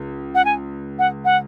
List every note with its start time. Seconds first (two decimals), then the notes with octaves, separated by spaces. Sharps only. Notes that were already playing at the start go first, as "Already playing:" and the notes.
Already playing: C#2
0.35 F#5
0.45 G#5
0.99 F#5
1.25 F#5